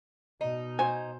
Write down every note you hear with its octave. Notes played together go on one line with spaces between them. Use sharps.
B2 D#4
F#4 C5 G#5